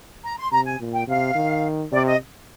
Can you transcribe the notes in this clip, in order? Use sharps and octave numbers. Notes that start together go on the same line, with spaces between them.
A#5
C6
C3 A#5
G#5
A#2
G5
C3 F5
D#3
C3 D5
D#5